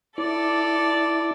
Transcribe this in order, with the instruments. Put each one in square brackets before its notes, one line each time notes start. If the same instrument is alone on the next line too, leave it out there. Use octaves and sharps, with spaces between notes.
[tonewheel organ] E4 D6 [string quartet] A4 D5